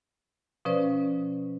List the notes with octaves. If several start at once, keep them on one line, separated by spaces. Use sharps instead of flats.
B2 F3 C#4 B4 C5 D5